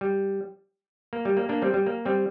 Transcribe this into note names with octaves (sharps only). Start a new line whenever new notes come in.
G3
A#3
G3
A#3
A#3 D4
G3 C4
G3
A#3
G3 C4